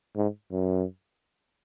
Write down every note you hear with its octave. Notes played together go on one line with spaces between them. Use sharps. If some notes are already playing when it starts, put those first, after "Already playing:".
G#2
F#2